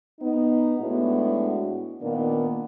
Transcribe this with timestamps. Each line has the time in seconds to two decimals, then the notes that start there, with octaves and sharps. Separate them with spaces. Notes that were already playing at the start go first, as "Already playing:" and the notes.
0.20 B3 D#4
0.79 A2 G#3 B3 D4 E4 F#4
2.01 A#2 D#3 A#3 B3 D4